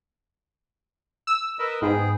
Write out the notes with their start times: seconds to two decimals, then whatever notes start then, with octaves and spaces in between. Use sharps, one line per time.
1.27 E6
1.59 A#4 B4 D#5
1.82 G#2 B3 G#4 G5